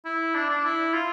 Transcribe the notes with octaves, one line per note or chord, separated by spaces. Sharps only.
E4
D4
D4
E4
F4